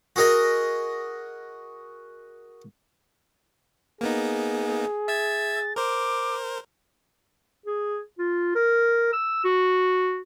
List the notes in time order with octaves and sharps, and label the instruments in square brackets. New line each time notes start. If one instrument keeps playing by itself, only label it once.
[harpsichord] F#4 G#4 A#4 D#5
[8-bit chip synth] A#3 B3 D#4 [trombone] G#4
[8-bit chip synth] E5 E6 G#6 [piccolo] A6
[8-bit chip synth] A#4 C5 [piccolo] D6
[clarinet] G#4
F4
A#4
E6
F#4